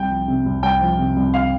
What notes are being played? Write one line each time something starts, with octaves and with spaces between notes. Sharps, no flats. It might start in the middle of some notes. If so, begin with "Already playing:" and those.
Already playing: C2 G5
F3
C3
C2
C2 G5
F3
C3
C2
F5